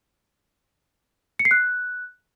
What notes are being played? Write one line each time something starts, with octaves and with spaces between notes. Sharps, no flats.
C#7
C7
F#6